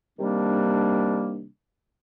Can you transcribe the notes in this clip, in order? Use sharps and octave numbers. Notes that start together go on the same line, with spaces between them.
C3 D#3 G3 A#3 D4